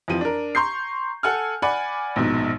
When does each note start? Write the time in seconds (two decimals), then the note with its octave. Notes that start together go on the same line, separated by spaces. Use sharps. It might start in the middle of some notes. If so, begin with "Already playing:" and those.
0.08 F2 E3 F3 D#7
0.21 D4 A#4
0.55 A#5 C6 C#6 G6 C7
1.23 A4 F#5 G#5 F6
1.62 D5 F#5 G#5 B5
2.16 A#1 G#2 B2